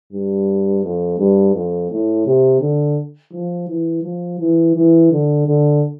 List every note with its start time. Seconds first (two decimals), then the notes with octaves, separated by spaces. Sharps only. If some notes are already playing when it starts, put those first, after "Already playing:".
0.13 G2
0.83 F2
1.18 G2
1.55 F2
1.91 A2
2.26 C3
2.61 D3
3.33 F3
3.69 E3
4.03 F3
4.40 E3
4.75 E3
5.11 D3
5.46 D3